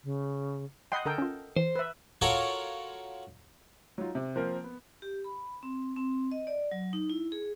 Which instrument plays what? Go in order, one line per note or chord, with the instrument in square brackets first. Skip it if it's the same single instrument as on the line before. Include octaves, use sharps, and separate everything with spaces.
[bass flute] C#3
[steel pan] D#5 F#5 C6 [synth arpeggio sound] G5 B5 G6
[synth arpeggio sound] D3 A#5 D#6 [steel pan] A4 A#4 G5
[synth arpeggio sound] C#4 F4
[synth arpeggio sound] E3 [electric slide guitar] C5
[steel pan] B4 E5
[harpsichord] F4 F#4 A4 A#4 C#5
[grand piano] F#3 D#4 F4
C3
F3 A#3 C4 A#4
B3
[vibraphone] G4
B5
C4
C4
D#5
D5
F#3
D#4
E4
G#4